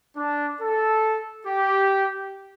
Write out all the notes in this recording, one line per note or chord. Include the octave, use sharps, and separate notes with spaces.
D4
A4
G4